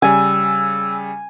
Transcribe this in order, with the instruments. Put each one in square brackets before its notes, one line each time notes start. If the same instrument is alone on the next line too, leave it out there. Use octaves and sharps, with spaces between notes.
[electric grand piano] C#3 G3 [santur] G#5 [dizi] E6